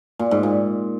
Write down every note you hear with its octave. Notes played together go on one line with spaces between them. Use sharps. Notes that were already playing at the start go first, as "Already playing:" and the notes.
A#2
G#2
A#2